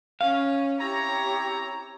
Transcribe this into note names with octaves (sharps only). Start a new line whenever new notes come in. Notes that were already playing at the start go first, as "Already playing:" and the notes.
C#4 F5
C4 E4 G4 C#5 A#5